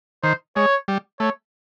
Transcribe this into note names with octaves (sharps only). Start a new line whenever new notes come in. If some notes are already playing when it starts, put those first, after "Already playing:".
D#3 C5
G#3 C#5
G3
A3 C#5